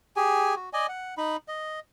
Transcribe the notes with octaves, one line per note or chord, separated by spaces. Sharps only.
G4 G#4 G#5
F#4
D5 D#5 G#5
F#5
D#4 B5
D#5